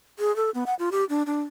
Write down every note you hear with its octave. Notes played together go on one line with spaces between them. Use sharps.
G#4
A4
B3
F#5
F4
G4
D4
D4